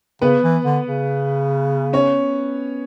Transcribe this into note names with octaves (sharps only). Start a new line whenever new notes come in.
C#3 B3 B4
E3
D3
C#3
C#4 C#5